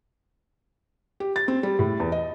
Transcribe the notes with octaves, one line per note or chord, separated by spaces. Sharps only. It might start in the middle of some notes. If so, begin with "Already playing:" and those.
G4
A6
C4
G3
A2
E2
D#5